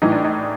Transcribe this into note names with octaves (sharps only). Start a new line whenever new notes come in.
A2 E3 D#4
D4
D#4